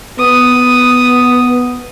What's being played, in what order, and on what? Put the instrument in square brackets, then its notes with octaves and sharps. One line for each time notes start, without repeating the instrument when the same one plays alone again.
[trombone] B3 [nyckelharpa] D#6